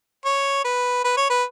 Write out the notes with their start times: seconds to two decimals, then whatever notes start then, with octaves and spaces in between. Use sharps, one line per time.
0.25 C#5
0.65 B4
1.04 B4
1.17 C#5
1.30 B4